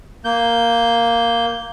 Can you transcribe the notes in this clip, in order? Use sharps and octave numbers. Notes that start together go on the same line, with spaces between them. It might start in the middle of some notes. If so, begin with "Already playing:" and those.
A#3 G6